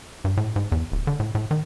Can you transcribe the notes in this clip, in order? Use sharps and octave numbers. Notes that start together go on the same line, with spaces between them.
G2
A2
G#2
E2
D1
D3
A2
A2
D#3